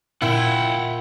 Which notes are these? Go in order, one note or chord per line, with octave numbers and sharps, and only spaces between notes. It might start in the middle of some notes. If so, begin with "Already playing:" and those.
A#2 E4 F#5 G5